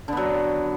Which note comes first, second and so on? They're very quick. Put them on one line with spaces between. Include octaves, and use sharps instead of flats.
D3 B3 F#3